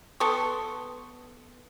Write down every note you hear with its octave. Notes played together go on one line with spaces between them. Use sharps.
B3 A4 C6 C#6